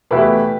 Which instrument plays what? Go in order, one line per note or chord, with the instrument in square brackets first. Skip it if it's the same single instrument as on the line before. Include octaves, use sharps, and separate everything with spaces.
[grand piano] E2 B2 A3 E4 [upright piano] G4 B4